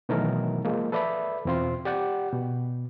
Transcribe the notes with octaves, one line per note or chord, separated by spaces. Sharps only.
B2 D#3 E3 F#3 A3 A#4
F3 G#3 A#3
A4 B4 D5 E5 B5
E2 B2 C4 F4 C6
G4 D5 F#5 G5
B2